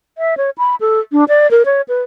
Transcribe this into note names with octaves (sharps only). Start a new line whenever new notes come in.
E5
C#5
B5
A4
D4
D5
A#4
C#5
B4